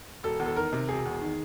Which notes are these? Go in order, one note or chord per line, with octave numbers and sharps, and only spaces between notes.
E1 A4
E2
A4
D#3 A#4
C3
E1 G#4
E2
D#3